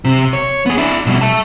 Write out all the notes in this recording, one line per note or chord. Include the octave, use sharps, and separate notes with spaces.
C3
C#5
B3 G#4
D4 E4
B2 G3
E5 A5